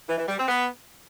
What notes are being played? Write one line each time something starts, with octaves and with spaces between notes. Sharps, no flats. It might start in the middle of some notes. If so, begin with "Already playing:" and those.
E3
E3
G3
C4
B3